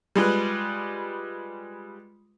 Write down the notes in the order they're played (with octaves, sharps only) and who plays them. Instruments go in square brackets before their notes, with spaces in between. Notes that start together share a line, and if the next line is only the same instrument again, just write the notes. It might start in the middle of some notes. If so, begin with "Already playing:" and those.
[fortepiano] G3 G#3 F4 B4